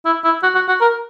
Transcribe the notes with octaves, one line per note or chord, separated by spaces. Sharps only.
E4
E4
F#4
F#4
F#4
A#4